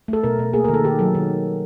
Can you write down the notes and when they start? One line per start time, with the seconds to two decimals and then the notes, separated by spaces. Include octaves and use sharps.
0.08 A3 A4
0.23 B2 A#4
0.39 B2
0.53 A#3 G#4
0.65 A#4
0.68 D#3
0.74 A4
0.84 D#3 G4
0.99 F#3 A4
1.15 D#3